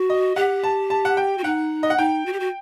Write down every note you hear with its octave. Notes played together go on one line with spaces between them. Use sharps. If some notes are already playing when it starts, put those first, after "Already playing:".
Already playing: F#4
D#5
G4 F#5
A5
A5
F#5
G5
F#4
D#4 F#5
D#5
F#5
D#4 G5
F#4
G4
F#4